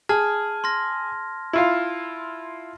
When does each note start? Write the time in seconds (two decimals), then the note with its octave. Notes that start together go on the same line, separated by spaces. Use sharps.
0.09 G#4 A5 F6 G#6
0.64 C6 F6 A#6
1.53 E4 F4 F5